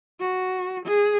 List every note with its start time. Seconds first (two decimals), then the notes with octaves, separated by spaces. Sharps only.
0.20 F#4
0.85 G#4